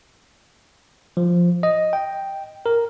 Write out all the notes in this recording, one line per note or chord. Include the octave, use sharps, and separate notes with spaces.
F3
D#5
G5
A#4